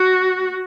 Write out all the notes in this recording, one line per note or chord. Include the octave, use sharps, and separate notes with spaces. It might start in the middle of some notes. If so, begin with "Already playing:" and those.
Already playing: F#4